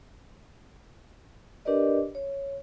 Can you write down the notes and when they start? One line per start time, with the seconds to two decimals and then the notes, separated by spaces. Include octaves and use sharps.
1.65 D4 G4 A#4 B4 D5 D#5
2.15 C#5